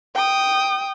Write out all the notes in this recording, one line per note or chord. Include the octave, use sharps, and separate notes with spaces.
G5 D#6